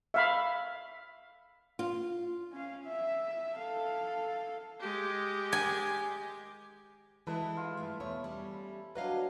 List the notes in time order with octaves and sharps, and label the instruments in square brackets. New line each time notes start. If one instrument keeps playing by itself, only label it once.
[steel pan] E5 F5 B5
[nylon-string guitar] F4
[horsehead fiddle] C#4 F5
E5
A4 F5
[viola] G#3 G4
[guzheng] G#5
[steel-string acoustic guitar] E3 G#3 E4 [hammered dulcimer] A4 B4
[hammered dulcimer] F4
[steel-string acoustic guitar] G2 G#3 A3
[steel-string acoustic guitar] E2 B2 C#5 [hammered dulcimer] E4
[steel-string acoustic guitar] G3 C#4
[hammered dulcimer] F#3 D4 [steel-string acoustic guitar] B4 D#5 F5